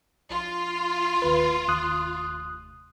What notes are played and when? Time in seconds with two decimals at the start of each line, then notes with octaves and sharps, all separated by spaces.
0.30 A#1 F4
1.22 F1 D#2 B4
1.68 D#2 D#6 F#6